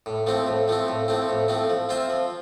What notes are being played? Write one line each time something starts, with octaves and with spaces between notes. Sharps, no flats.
A2
F3 A3 C4
A2
F3 A3 C4
A2
F3 A3 C4
A2
F3 A3 C4
F3
C4 F4 C5 E5
F3